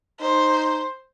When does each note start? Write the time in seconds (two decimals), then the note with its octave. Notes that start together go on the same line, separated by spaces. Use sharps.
0.21 D#4 C5